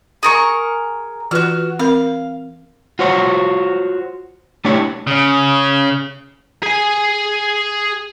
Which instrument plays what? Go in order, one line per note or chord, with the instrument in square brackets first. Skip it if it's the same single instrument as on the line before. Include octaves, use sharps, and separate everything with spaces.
[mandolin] G#4 A#4 C#6
[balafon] E3 F4 B4 [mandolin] F#4 F6
[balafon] C4 A#4 B5 [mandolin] F5
[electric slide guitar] F4 F#4 C5 C#5
A3 D4 E4 G4 C#5
[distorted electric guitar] C#3
G#4 G#5